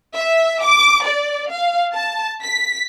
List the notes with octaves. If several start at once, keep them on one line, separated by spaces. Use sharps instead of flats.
E5
D6
D5
F5
A5
B6